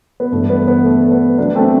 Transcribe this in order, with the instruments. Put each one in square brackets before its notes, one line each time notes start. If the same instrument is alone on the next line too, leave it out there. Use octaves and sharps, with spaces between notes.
[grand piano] B3
G1 G2 E3 A3
B3
B3
A3
B3
D2 D3 F#3 B3 D4
A3 C4